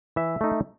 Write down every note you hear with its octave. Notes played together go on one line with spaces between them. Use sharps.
E3 E5
A3 D#4